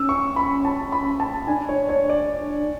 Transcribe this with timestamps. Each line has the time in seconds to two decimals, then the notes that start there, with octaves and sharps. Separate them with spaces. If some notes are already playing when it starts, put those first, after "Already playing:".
Already playing: C#4 E6
0.09 C#6
0.36 B5
0.65 A5
0.92 B5
1.20 A5
1.47 D4 G#5
1.69 C#5
1.89 C#5
2.10 D5